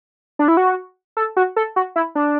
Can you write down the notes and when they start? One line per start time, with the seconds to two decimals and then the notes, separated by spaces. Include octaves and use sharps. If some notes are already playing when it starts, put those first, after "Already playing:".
0.39 D4
0.48 E4
0.57 F#4
1.17 A4
1.37 F#4
1.56 A4
1.76 F#4
1.96 E4
2.15 D4